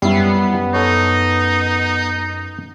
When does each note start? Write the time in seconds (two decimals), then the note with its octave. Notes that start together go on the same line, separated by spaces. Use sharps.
0.02 F#2 G3 B3 E4 C7
0.74 D#4 A4 C#5